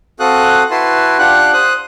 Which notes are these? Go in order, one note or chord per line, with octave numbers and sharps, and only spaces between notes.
C4 F#4 A4 F5 D#6 F#6
E4 F#4 B4 A5 C6
D4 F4 G4 F#5 G5 F#6
C5 D#6 F#6